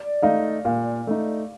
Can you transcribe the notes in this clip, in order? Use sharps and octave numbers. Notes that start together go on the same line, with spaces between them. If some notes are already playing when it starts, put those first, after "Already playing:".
Already playing: D5
A3 D#4 F5
A#2 F5
A3 D#4